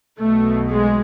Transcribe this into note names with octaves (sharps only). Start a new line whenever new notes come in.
B1 B2 A3
G#3